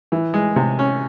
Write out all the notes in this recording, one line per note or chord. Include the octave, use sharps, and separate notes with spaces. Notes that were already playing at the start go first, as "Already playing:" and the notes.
E3
G#3
C3
C#4